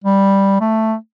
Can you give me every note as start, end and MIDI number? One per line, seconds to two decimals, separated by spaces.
0.04 0.60 55
0.61 0.95 57